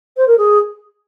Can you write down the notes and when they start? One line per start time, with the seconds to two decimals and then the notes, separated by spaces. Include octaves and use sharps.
0.16 C5
0.27 A#4
0.37 G#4